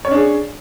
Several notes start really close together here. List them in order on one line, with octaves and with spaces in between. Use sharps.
C#5 C#4 D4 G#4